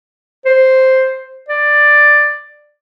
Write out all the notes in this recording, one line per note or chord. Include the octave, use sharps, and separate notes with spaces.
C5
D5